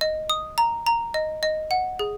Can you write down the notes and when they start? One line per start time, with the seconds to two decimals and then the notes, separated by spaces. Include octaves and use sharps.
0.01 D#5
0.30 D#6
0.58 A#5
0.86 A#5
1.14 D#5
1.43 D#5
1.71 F#5
1.99 G#4